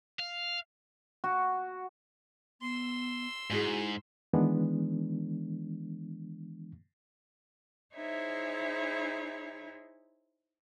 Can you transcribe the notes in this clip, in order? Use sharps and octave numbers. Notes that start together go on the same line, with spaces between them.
F5
F#4
B3 C6 E6
G#2 D#4 E4 F#4 G#4
D#3 E3 G#3 B3 D4
D#4 E4 G#4 C5 C#5 E5